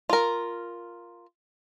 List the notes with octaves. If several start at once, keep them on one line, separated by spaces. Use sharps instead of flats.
F4 A#4